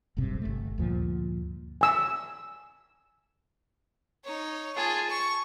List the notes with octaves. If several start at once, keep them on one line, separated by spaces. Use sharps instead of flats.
F1 B1 G2 C3
G1 A3
D2 G2 A#2 F3
G#5 E6
D#4 C#5
F4 G#4 G#5 A5
C#6